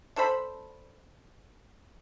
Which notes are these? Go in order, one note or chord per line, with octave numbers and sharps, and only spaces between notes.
D4 A4 C5 B5